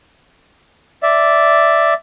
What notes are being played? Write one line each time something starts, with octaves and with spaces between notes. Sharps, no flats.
D5 E5